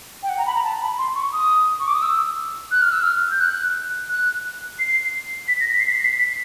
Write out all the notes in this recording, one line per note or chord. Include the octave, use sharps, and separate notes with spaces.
G5
F#5
A#5
B5
A#5
A5
B5
C6
C#6
D#6
C#6
D6
D#6
E6
F#6
F6
E6
F6
G6
F#6
F#6
C7
B6
A#6
B6
C7
B6
C7
B6
B6